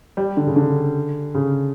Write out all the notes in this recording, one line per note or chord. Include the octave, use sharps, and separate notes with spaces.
G3
D3
C#3
D3
C#3